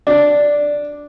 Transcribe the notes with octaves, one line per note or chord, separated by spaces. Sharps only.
D4